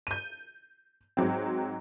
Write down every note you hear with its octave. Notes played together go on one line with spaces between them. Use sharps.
G6 D#7
G#2 F#3 C4